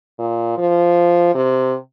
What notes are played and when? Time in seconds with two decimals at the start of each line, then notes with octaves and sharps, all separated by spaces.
0.19 A#2
0.58 F3
1.35 C3